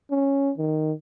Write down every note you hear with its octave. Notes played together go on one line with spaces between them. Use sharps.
C#4
D#3